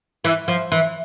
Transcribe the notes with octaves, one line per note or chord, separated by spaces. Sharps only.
E3
F3
E3